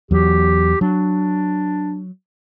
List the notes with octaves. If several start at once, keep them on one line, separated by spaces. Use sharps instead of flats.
E2 F#3 G4
F#3 D4